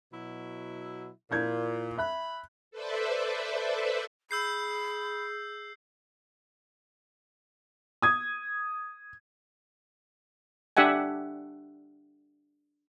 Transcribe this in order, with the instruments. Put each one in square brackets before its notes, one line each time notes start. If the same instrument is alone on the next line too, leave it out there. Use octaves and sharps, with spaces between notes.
[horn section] B2 F#3 E4
[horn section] A#2 [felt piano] E4 G6 G#6
[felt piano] E5 F#6 [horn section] B5
[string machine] A4 B4 C5 D5 E5
[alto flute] G#4 [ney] B5 [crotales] E6 G6 C7
[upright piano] D#6 G#6
[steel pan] D4 G4 E5 F#5 G#5